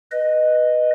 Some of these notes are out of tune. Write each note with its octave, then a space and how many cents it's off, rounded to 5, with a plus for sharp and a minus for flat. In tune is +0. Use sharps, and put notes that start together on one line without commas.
B4 +0 D#5 -10